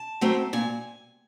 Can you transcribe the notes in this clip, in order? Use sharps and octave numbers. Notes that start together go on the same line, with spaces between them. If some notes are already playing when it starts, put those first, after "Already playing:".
Already playing: A5
F#3 A3 C4
A#2 G#5